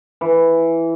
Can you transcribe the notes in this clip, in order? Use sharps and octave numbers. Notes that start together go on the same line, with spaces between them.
E3